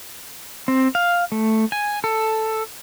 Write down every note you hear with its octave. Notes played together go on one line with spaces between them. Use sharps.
C4
F5
A3
G#5
A4